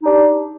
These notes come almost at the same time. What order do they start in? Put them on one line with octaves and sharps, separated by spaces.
D#4 G4 D4